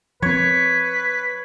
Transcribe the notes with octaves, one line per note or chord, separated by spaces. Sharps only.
F3 C4 B4 C#5